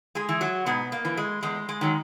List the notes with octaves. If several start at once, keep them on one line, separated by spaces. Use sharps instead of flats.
G#3 G#4
E3
F#3 F#4
G#2 B2 B3
A#3
E3
G#3
E2 G#3
G#3
D#3 F#3